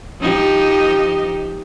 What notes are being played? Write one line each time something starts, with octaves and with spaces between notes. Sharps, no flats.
F3 D#4 G4